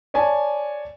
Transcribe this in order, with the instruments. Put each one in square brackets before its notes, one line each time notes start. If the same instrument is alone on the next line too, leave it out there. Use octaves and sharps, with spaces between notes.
[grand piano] C#5 D5 G#5 A5